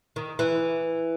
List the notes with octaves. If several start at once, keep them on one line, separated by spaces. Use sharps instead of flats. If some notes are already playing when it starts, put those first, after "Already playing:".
D#3
E3